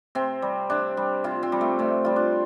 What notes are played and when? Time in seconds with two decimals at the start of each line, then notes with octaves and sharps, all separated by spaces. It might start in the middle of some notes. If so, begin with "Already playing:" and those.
0.15 C3 C4
0.42 G3
0.70 C3 D4
0.97 G3
1.24 C3 F4
1.43 C4
1.52 G3
1.61 A3
1.79 C3 A3
2.05 G3 F4
2.16 D4